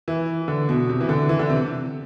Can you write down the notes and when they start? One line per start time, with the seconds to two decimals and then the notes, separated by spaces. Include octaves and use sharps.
0.08 E3
0.48 D3
0.69 B2
0.89 C3
1.00 E3
1.09 D3
1.29 E3
1.39 D3
1.50 C3